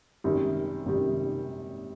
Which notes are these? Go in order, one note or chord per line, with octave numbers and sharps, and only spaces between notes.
G#1 F#2 D#3 G3
G#1 F#2 D#3 G3